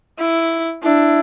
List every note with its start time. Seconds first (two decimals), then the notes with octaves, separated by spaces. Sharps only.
0.19 E4
0.83 D4 E4